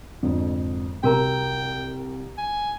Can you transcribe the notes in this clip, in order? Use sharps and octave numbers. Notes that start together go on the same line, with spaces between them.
F2 G#2 D3
C2 F#4 A#4 G5 A#5
G#5